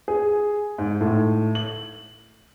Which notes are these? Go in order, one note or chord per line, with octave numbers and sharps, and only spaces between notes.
G#4
G#2
A2
F#7